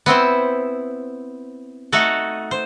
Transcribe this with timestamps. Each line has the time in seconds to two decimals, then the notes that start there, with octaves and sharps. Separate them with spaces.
0.06 B3 C4 E4 C5
1.92 A3 D#4 F#4 A4
2.51 C5